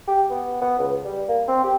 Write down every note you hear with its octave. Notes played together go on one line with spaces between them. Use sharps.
G4
B3
B3
C#2
G3
A#3
C4
G4